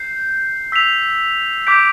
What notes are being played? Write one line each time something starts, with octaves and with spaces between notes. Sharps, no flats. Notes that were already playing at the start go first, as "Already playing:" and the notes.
Already playing: G6 C7
E6 B6 F7
D6 G6 B6 D7